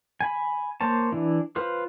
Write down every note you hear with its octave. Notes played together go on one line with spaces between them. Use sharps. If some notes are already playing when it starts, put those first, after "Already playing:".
G#5 B5
A#3 C5 C#5 A5
E3 D4 E4
F4 B4 C5